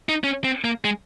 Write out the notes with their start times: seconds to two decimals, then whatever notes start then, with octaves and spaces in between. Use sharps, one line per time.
0.09 D#4
0.24 C#4
0.44 C4
0.64 A#3
0.85 G#3